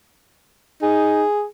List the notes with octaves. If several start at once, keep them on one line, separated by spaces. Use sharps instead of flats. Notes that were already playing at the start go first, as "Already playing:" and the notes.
D#4 G#4